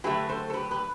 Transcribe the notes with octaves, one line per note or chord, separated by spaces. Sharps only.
D3 F#3 A3 G4 B4
A4 C5
A4
G4 B4
G4 B4